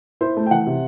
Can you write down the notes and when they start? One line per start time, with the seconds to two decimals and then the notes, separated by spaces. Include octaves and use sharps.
0.21 E4 C5
0.37 A3
0.46 G5
0.51 E3 F#5
0.67 C3